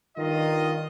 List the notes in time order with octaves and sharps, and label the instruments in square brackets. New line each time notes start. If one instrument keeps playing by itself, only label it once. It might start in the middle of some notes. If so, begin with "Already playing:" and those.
[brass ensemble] G2 F4 D#5 [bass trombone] D#3